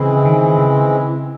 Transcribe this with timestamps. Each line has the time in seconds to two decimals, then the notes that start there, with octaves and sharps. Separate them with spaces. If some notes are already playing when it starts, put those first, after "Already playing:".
Already playing: C#3 E3 G#3 C4 E4
0.25 D#3
0.58 C#3